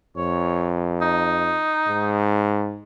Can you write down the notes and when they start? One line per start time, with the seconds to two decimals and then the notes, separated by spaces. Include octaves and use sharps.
0.17 F2 C#5
1.02 D#4
1.88 G#2